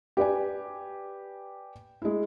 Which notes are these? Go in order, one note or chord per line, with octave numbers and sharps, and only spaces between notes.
G4 B4 D5 G#5
G#3 E4